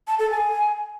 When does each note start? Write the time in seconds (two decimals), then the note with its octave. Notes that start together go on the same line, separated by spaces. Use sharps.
0.08 A5
0.19 A4
0.30 G#5